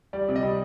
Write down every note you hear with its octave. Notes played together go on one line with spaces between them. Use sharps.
G3 D5
C3
D#5
G3